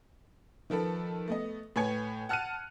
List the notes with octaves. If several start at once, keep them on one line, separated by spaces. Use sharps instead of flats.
D#3 F3 A4 B4
A3 B3 D#5
A2 B4 C#5 G#5 G#6 C#7
F#5 A5 F6 F#6 C#7 D#7